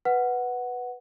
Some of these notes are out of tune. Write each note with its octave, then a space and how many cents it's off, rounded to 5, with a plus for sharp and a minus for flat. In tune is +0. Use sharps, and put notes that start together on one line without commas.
B4 +0 F#5 +0